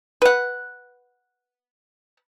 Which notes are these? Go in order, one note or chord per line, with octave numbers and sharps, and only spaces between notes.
B4 F#5